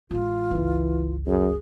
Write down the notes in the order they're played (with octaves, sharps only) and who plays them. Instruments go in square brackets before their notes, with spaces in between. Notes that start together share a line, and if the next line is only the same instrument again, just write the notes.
[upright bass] A1 G#3 [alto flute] F4
[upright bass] G1 C#2 [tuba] E3
[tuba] F#2 [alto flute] G#4